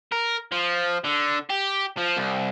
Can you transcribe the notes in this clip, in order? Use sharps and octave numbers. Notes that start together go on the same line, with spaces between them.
A#4
F3
D3
G4
F3
C2